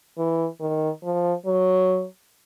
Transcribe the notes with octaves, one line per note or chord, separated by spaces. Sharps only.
E3
D#3
F3
F#3